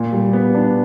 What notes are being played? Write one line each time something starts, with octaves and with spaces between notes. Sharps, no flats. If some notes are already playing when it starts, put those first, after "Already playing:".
Already playing: A#2
G3
B3
D4